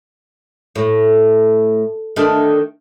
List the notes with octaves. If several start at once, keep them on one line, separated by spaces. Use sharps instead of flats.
A2
D#3 A3 D4